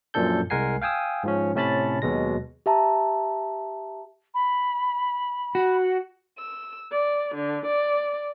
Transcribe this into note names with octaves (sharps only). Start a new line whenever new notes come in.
F#2 A#2 F3 D4 A4 G6
C2 G#3 A#4 F#5 G#5 C7
F5 G5 G#5 D#6 E6
G#2 F3 C#4
A2 C3 C#4 A5 B5 A6
D#2 B2 F#3 G#3 A#6
G4 E5 A5 A#5
B5
F#4
E6
D5
D3
D5